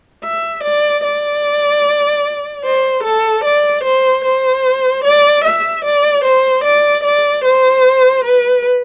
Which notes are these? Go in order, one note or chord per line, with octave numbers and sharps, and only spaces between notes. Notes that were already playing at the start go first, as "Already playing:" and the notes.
E5
D5
D5
C5
A4
D5
C5
C5
D5
E5
D5
C5
D5
D5
C5
B4